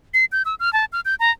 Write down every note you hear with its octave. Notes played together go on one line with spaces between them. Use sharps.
C7
G6
E6
F6
A5
F6
G6
A#5